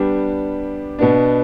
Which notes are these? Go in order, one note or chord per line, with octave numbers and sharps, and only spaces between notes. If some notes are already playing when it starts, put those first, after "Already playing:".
Already playing: G3 B3 D4 G4
B2 B3 D4